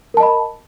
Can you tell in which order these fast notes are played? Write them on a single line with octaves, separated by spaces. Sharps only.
A#4 A5 D#5 B5